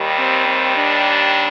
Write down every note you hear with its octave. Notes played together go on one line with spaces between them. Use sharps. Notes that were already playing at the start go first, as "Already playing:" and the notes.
Already playing: D#2 D#3 G3
C4
C4
D4